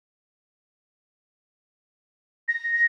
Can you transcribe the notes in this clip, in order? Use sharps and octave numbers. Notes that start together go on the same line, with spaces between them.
A#6